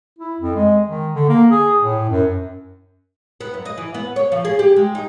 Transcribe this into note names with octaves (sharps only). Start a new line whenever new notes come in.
E4
F2
G#3
D#3
D3
A#3
G#4
A2
F#2
B3
F#2
D#5
E3
B3
C#5
F3
G#4
G4
G#3
D#4